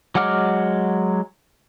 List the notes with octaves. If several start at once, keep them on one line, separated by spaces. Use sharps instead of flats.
F#3 G#3 F#5 D6 F6